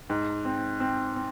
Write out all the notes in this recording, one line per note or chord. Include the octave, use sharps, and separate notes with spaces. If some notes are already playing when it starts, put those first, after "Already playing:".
G#2
C4
C4
C4